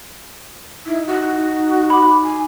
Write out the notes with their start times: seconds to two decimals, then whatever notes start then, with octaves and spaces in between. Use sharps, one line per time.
0.86 D#4 E4
1.07 F#4
1.90 B5 D6
2.24 G#5